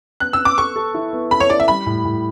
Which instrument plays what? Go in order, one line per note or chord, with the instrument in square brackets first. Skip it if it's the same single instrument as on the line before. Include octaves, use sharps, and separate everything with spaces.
[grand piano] B3 [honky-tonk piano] F#6
[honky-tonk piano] E6
[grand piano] B3
[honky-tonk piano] D6
[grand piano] A4 [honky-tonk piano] C#6
[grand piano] A4
E4
B3
[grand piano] A4 [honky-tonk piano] B5
[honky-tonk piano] C#5
[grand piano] E4 [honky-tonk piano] D5
[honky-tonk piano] E5
[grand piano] G3 [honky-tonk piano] B5
[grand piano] A2
A2